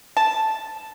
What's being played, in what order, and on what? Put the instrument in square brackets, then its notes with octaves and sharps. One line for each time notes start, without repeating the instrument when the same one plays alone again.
[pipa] A5